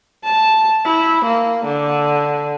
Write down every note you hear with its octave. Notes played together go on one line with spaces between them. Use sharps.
A5
E4
A#3
D3